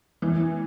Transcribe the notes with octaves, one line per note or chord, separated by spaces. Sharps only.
E3